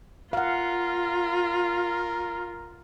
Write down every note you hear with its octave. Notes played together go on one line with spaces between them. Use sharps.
F4 A#4 F5 F#5